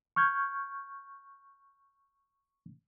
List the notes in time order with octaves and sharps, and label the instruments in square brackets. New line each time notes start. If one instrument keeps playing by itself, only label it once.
[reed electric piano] C#6 F6 G6 G#6